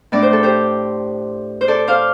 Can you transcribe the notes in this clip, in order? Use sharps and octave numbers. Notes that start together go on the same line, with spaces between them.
A2 A3 D4 D5
C5
A4
G4 C5
C5
A4 D5
C5 F5